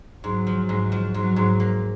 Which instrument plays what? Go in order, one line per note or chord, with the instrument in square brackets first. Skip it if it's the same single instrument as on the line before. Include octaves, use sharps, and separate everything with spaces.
[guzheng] G#2 [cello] F#3
[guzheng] F3
G#2
F3
[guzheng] G#2 [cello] F#3
[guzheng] G#2
A#3